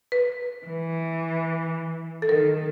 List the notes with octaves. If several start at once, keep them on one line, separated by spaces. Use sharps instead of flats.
B4
E3
A4
D#3 A#4